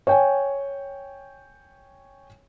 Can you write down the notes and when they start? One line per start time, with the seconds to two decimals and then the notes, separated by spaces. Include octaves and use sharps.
0.07 C#5 G5 G#5